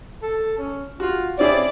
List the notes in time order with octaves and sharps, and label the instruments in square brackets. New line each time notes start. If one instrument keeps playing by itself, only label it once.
[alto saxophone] A4
C#4
[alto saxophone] F4 [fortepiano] F#4
[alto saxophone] C4 [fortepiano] C#4 E4 G#4 [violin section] D5